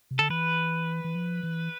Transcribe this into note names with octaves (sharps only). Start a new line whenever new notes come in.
C3
D3 A4
E3 B4
E3
F3
E3